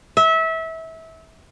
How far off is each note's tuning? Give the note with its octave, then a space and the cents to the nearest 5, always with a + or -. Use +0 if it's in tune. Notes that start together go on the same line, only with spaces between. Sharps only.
E5 -25